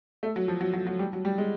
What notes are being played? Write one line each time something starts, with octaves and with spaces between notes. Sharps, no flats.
A3
F#3
F3
F#3
F#3
F#3
G3
F#3
G3
G#3